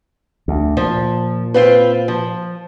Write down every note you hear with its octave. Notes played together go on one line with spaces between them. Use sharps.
D2
A#2 F3
C4 F4 B4
F3